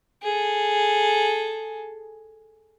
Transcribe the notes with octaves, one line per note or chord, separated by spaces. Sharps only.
G#4 A4